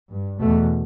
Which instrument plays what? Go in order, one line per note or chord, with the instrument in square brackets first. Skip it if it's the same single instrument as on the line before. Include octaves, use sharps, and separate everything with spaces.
[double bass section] G2
E2 B2 A3